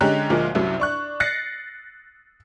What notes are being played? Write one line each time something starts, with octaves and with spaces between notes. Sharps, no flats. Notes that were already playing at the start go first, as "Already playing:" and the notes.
D3 G#3 C#4 G4 A#5 F#6
D2 A#2 F3 G#3 A#3
C2 F#2 C3 F#3
D4 C#6 F#6
F#6 A6 A#6 C7 C#7